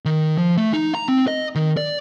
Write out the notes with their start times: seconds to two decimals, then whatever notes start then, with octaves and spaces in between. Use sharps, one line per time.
0.05 D#3
0.38 F3
0.57 A3
0.73 D#4
0.95 A#5
1.08 C4
1.28 D#5
1.55 D#3
1.77 D5